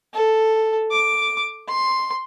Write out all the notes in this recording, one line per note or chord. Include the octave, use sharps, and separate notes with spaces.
A4
D6
C6